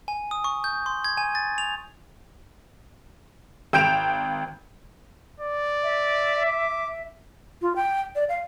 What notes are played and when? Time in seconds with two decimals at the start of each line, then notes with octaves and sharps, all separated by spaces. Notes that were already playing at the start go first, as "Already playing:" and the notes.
0.08 G#5
0.31 D#6
0.44 C#6
0.64 G6
0.86 C6
1.04 G#6
1.18 G#5
1.35 A6
1.58 F7
3.73 G#1 G5 G6 D7 E7 F7
5.40 D5
5.83 E5
6.46 D6
7.62 F4
7.76 G5
8.15 D5
8.29 F5